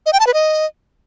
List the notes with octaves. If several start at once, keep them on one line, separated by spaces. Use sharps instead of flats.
D#5
G5
A5
B4
D#5